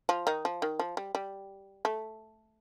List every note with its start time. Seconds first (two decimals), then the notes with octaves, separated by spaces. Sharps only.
0.09 F3 F4
0.27 D#3 D#4
0.45 F3
0.62 D#3
0.79 F3
0.97 G3
1.15 G3
1.85 A3